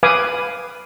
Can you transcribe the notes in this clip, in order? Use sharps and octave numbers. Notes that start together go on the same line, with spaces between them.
B4 F5 G#5 B5 D6 D#6